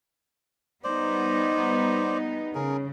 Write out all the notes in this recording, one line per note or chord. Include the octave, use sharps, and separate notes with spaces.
G3 B3 D#4 C5 D5
C#3 G#4 A#4